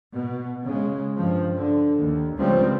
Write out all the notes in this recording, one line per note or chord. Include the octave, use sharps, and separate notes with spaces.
B2
C#3 G#3
G2 F3
D3
D#2
C#2 F3 G3 C4